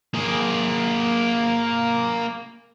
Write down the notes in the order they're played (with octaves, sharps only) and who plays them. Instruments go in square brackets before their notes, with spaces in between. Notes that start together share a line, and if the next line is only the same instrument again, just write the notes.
[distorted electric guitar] A#3 G#4